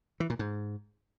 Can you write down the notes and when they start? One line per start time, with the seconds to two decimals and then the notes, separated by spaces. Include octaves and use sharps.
0.20 E3
0.30 A#2
0.39 G#2